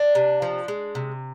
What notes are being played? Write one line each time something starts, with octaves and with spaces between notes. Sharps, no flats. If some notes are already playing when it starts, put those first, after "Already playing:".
Already playing: D4
C3
F3
G#3
C3